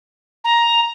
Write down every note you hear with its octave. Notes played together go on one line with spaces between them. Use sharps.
A#5